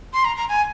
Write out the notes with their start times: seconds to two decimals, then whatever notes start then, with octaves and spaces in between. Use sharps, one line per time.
0.13 C6
0.25 A#5
0.37 A#5
0.49 G#5